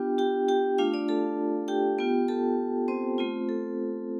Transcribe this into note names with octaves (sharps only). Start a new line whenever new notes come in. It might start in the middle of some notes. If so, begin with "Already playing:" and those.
Already playing: B3 D4 F4 G4 G5
G4 G5
G4 G5
A3 D4 F4 F5
D4 D5
A4 A5
G4 G5
B3 F4
A4 A5
C4 C5
A3 C4 F4
A4